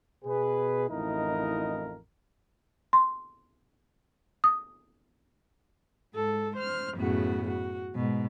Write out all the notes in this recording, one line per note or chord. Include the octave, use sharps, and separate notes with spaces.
B2 G#4 B4
A1 F2 D#4 E4 A#4 D#5
C6
D#6
G#2 A4
C5 F6
F#2 A2 C#3 B3 F#4
F#4
G#2 B2